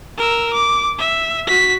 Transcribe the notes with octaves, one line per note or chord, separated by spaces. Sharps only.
A#4 E6
D6
E5
F#4 B6